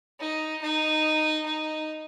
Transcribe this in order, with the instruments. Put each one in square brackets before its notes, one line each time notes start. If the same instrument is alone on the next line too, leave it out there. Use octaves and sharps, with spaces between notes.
[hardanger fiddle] D#4
D#4
D#4